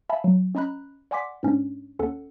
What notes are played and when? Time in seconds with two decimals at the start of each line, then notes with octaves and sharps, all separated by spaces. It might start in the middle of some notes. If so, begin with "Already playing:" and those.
0.09 E5 F5 G#5 A5 B5
0.24 F#3
0.55 C#4 D#5 A#5 B5 F#6
1.11 D5 F#5 G#5 C6 D6 B6
1.43 G#2 C#4 D4
1.99 D#2 C#4 A4 F#5